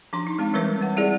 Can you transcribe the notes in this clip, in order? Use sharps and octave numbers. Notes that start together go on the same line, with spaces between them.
F3 D4 C6
D#4
G#3 C4 F5
E3 G3 C4 A#4 B4 C#5
C4 F#5
G3 E4 G#4 D5